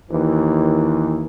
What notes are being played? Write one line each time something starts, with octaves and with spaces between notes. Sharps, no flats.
D#2 E3